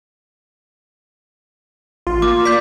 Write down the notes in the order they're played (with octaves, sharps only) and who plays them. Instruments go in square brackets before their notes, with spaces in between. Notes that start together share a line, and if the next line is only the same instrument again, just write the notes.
[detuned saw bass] A1 [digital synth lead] F4
[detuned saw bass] A#3 [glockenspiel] D6
[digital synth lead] D5 [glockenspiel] G6 B6